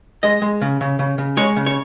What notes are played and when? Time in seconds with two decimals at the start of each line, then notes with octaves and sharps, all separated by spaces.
0.23 G#3 D#5
0.42 G#3
0.61 C#3
0.81 C#3
0.99 C#3
1.18 C#3
1.37 G#3 C#5
1.56 C#3
1.66 C#5